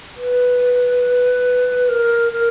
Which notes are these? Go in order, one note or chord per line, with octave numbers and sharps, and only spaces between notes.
B4
A#4
A#4